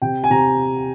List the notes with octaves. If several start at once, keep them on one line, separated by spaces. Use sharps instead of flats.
C3 G5
G#5
C3 A#5